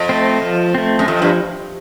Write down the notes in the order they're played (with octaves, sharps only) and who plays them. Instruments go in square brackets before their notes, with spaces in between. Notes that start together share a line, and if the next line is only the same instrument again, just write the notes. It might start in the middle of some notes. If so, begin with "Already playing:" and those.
Already playing: [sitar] F2
[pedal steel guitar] A3 C4
F3
A3 C4
[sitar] F#2
[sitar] F2 [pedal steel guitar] F3
[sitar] G2